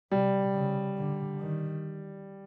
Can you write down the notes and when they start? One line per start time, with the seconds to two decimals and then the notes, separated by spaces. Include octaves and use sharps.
0.11 C3 G3
0.54 C#3
0.97 D3
1.40 D#3